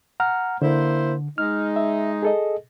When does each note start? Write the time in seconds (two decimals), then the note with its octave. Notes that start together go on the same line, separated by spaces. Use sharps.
0.20 F#5 A#5 F6
0.62 D3 A#3 E4 C5
1.38 G#3 D#4 F6
1.76 E5
2.23 G#4 A4 D#5